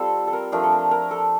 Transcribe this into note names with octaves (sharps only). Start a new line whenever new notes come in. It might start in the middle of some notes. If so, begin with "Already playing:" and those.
Already playing: G3 C4 F4 A4
A4
A#4
F3 A3 D4 A#4
A4
A#4
A#4
A4